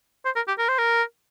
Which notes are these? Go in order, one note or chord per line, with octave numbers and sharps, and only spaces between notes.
C5
A#4
G4
A#4
C5
A#4